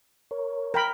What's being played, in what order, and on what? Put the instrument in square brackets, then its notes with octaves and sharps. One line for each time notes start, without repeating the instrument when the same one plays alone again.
[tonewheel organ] A#4 C#5
[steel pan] A#4 G5 B5